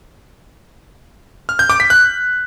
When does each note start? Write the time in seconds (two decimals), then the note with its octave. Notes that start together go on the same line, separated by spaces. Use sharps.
1.49 F6
1.59 G6
1.70 D6
1.80 B6
1.90 F#6